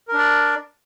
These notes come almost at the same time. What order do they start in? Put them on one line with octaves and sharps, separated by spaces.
A#4 D4 D5